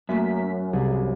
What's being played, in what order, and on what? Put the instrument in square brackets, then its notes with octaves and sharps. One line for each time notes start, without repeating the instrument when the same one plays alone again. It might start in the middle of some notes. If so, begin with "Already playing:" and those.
[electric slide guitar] F#2 [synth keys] A3 A#3 B6 [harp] E5
[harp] C2 [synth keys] G#4